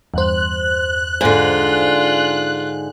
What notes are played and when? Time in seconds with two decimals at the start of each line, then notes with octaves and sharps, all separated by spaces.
0.14 E2 G2 C5 F#6
1.21 G#2 D3 F4